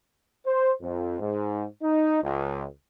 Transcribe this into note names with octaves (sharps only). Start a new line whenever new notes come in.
C5
F2
G#2
D#4
C#2